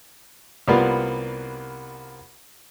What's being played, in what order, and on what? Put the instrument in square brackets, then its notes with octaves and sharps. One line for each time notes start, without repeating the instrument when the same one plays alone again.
[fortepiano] C2 G3 A#3 B3 F4 F#5